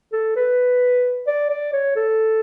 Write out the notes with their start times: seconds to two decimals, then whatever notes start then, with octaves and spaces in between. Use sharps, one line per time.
0.12 A4
0.36 B4
1.27 D5
1.50 D5
1.72 C#5
1.96 A4